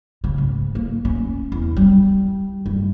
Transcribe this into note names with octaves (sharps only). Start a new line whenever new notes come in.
C#3
G#2
A#3
C#4
E2
G3
G2